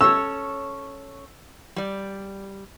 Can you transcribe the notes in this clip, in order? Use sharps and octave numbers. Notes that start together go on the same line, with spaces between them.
C#4 A4 C#5 E6
G3 D5